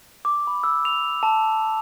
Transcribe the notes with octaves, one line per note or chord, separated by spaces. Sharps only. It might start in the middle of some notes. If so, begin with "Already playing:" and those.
D6
B5
E6
F7
A5